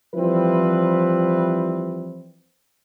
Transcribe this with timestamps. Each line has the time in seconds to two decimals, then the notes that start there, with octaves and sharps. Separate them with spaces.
0.15 E3 F3 G3 C4 E4 B4